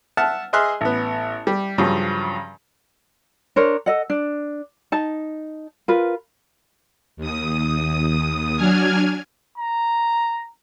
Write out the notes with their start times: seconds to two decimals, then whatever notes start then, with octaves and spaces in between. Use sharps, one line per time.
0.17 E5 F#5 A5 F6
0.53 G#4 D#5 E5 C6 F6 F#6
0.81 A1 B3
1.47 G3
1.78 G2 C#3 F3 F#3
3.56 D4 A#4 C5 C#5
3.86 A4 D#5 F#5
4.10 D4
4.92 D#4 A5
5.88 F4 A#4 B4
7.17 D#2 D#6
8.56 F#3 D4 G#5 F6 G#6
9.58 A#5